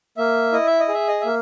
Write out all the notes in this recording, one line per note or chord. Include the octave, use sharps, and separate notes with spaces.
A#3 E5
E4 D#5
E5
D#5
G#4
E5
D#5
A#3 E5